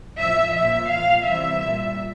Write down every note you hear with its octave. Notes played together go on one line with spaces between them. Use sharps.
A2 F3 E5
A#2 F3 E5
A#2 F3 F5
C3 E3 G3 E5
A#2 G3